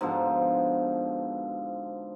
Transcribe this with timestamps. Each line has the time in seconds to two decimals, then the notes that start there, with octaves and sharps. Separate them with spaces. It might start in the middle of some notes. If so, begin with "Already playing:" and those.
0.01 G#2 B2 D3 F3